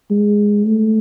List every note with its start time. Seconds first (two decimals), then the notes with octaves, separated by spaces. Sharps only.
0.10 G#3
0.66 A3